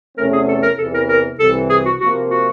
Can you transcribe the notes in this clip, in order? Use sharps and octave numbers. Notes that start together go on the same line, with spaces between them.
E2 C3 E3 A3 C#4 A#4
G#4
A4
A#4
E2 C3 E3 A4
A#4
A#4
C2 C3 E3 A4
G#4
F#4
C3 F3 A#3 F#4
F#4